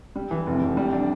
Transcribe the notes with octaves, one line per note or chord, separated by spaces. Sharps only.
G3
E3
F1
F1
G3
D4